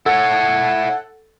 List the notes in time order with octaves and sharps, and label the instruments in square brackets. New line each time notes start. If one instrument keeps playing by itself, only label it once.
[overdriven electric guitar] E4 C#5 [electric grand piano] A4 [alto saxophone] F#5